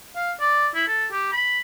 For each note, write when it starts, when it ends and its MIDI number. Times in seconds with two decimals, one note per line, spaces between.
0.16 0.32 77
0.41 0.68 74
0.75 0.86 64
0.88 1.07 69
1.12 1.28 67
1.33 1.61 83